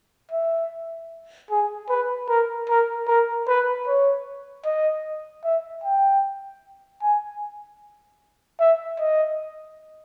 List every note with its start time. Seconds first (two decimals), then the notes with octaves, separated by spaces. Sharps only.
0.31 E5
1.50 G#4
1.89 B4
2.29 A#4
2.69 A#4
3.08 A#4
3.48 B4
3.87 C#5
4.65 D#5
5.44 E5
5.84 G5
7.02 G#5
8.60 E5
9.00 D#5